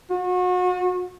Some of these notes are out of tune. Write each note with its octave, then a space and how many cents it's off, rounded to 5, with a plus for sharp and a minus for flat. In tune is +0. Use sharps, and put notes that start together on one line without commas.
F#4 -35